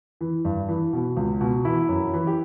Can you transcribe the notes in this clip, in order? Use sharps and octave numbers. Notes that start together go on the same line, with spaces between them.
E3
G2
E3
B2
C#2
B2
E3 E4
F#2
E3
G4